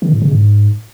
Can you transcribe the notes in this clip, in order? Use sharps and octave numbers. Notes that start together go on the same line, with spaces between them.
D#3
A2
C#3
G#2